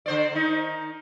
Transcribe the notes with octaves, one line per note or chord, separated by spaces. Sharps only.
D3 C5 D5
D#3 D#4